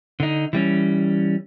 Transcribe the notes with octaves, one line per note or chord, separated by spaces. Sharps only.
D3 D#4
E3 G3 C#4